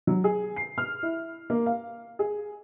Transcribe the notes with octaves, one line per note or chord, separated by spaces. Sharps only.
F#3
G#4
C7
F6
E4
A#3
F5
G#4